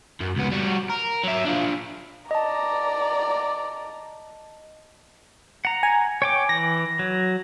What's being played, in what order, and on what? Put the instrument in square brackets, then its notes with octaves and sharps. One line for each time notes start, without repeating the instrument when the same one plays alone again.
[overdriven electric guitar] F#2
C#2 B3
G3 F#4
A#4
F#3 E5
D4 F4
[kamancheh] D5 A#5 [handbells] D#5 A5
[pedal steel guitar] F#5 A#5
[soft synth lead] G#5
[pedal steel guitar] C#5 G5 D6
[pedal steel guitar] E3 [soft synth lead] A#6
[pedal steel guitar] F#3